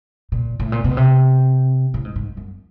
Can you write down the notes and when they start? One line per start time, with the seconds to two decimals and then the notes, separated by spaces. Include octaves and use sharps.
0.32 A#2
0.60 A2
0.72 A#2
0.84 B2
0.97 C3
1.94 A2
2.05 G#2
2.16 G#2
2.37 F#2